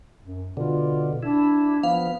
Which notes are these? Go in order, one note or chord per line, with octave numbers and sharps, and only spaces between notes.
F#2
B2 D3 F4
D4 E4
F3 B3 F5